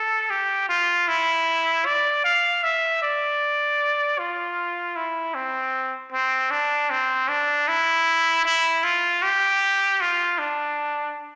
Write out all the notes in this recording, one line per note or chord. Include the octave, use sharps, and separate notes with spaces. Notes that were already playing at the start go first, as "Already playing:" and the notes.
Already playing: A4
G4
F4
E4
D5
F5
E5
D5
F4
E4
C4
C4
D4
C4
D4
E4
E4
F4
G4
F4
D4